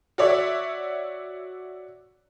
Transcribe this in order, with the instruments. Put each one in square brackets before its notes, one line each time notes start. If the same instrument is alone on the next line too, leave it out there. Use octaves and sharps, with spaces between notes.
[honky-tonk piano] F#4 C#5 D5 E5